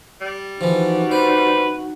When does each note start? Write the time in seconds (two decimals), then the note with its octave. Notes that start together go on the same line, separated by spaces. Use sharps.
0.21 G3
0.61 E3 F3 D#4 F#4
1.11 B4 C5